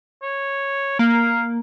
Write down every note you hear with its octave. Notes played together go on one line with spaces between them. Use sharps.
C#5
A#3 F5